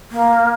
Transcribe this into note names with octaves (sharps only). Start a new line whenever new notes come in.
A#3